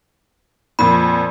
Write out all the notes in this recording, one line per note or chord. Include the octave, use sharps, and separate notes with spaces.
F2 A#2 B5